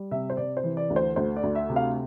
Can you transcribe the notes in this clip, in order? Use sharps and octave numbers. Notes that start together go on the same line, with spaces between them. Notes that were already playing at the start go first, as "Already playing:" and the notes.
Already playing: G3
C3 E5
C5
C3 D5
C5
E3
D5
D2
C5
D2 C5
D5
D2
E5
C3
F5